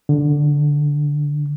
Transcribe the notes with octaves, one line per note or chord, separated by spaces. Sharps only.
D3